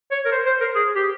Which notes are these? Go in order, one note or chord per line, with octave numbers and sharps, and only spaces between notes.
C#5
A#4
C5
C5
A#4
G#4
G4